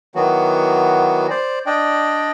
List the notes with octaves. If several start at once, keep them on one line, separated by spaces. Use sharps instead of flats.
D#3 E3 F#3 B3 F#4
C5 D5
D4 D5 D#5 G5